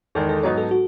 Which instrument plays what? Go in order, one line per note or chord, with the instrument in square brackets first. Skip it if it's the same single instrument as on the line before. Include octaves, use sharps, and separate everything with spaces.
[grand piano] E2 D#3 G#3 [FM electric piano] A4
[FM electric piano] A4
[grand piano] G#2 F#3 B3 D#4 [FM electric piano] C#5
[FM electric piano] A4
F#4